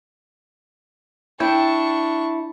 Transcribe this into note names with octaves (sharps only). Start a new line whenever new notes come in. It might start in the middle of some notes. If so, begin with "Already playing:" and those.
D4 E4 G5 C#6